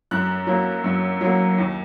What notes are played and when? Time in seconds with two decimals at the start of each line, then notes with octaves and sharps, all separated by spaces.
0.11 F#2 F#6
0.47 F#3 A#3
0.84 F#2
1.21 F#3 A#3
1.58 D#2